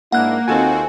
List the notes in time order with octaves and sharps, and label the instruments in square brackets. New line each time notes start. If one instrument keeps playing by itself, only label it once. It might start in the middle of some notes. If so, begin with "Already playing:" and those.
[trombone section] G#2 D4 E4 [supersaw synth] A#3 [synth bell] F#5 F#6
[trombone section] D#2 D#4 F4 [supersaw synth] C4 F#4 [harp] A4 G#5